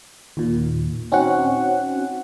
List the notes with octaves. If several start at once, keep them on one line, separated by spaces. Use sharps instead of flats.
D#2 A#2
C4 C#4 D#4 F#4 F#5